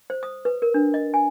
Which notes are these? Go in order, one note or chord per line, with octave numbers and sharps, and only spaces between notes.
C5
D#6
B4
A#4
D4
D#5
G#5